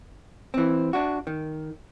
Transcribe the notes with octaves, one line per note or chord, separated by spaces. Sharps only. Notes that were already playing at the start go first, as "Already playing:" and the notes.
E3 C4
D4 F#4
D#3